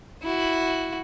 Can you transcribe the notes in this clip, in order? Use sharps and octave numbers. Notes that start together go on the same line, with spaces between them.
E4 F#4